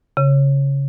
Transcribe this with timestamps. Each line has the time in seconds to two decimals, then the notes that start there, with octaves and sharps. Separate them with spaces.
0.17 C#3